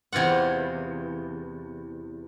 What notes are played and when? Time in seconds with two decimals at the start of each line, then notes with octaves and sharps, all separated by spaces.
0.13 E2 C3 E3 F4 F#5